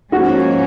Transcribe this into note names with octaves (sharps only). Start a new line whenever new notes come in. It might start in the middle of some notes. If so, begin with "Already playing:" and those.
G#2 F3 A#3 C#4 F#4